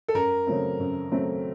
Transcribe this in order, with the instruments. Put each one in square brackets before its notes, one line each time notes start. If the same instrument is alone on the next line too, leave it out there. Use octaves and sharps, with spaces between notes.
[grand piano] A4
[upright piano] F#2 [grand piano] A#4
[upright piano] C#3 F#3 A3 C4
F#2
C#3 F#3 A3 C4